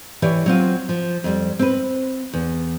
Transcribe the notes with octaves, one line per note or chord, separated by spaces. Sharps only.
E3 G4 C#5 D5
F#3 C4 F4
F3
F2 G3
C4 B4
E2